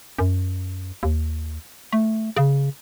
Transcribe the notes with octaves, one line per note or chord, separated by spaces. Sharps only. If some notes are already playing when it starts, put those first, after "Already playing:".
F#2
D#2
A3
C#3